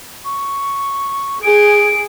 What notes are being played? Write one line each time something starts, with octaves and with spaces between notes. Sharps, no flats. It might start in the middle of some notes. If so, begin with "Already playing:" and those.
C#6
G#4 D7